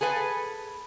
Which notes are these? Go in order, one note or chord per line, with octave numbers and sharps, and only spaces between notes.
G#4 A4 B4 E5 G#5